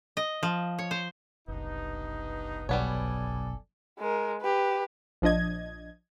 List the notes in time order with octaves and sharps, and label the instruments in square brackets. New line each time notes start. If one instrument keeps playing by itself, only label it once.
[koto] D#5
F3
C#5
C5
[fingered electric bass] F#1 C2 [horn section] G2 B3 D#4
[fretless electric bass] B1 [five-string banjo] G3 B3 C#5 [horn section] A4 D5 G#5
[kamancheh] G#3 A#4
G4 B4
[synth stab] A#1 F3 D4 D#5 G#6